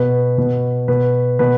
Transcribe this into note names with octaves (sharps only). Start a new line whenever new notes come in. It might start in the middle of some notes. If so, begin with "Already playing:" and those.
Already playing: B2 B4
B2
B2 B4
B2 B4